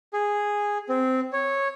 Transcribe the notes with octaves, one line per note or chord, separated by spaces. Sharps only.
G#4
C4
C#5